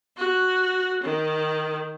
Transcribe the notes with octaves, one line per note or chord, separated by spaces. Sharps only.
F#4
D#3